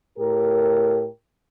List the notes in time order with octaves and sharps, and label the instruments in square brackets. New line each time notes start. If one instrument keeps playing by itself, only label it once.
[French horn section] A2 G4 A#4